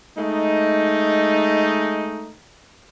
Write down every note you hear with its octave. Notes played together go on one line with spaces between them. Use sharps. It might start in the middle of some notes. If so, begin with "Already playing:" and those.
G#3 A3 D#4